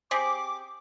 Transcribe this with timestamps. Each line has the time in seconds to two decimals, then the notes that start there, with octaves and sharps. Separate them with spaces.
0.11 C4 G4 G#4 D6